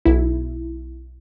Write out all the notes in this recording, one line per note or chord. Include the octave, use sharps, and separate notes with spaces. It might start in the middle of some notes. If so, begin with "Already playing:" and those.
B1 E4